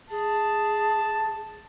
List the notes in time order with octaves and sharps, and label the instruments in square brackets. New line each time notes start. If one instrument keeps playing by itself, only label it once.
[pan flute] G#4 [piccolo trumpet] A5